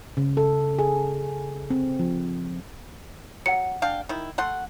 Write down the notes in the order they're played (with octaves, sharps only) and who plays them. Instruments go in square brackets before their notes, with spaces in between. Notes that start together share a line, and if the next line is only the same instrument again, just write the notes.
[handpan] C#3
A4
G#4
C4
F3
[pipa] F#3 [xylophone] F#5 C#7
[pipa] D4 F5 G5
D#3 E4
A3 F#5 C6